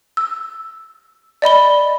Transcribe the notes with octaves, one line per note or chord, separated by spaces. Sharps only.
E6
D5 D#5 B5 G7